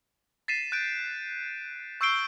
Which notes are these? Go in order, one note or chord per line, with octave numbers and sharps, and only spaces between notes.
A6 B6 C7 D#7 E7
F#6 G6 D7
C#6 E6 G6 C7 D7 G7